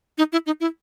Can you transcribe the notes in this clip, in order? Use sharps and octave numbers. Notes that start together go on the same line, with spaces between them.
D#4
E4
D#4
E4